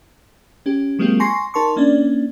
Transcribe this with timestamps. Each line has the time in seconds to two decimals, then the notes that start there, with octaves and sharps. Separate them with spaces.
0.66 C#4 G4
0.99 F#3 G#3 A#3 C4 F4 G4
1.20 G#5 C6 C#6 A#6 C7
1.54 D#4 A#4 A5 C6 C#6
1.76 A#3 C#4 D4 D5